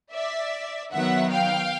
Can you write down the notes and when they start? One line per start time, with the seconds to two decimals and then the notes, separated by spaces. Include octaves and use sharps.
0.12 D5 E5
0.92 D#3 F#3 B3 E5 F#5
1.32 F5 G5